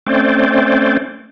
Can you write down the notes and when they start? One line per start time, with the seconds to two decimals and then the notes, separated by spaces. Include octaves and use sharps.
0.07 A3 C4 C#4 C5 D5